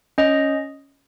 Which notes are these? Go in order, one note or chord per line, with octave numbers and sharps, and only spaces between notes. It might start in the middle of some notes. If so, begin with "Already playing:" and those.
C#4 D#5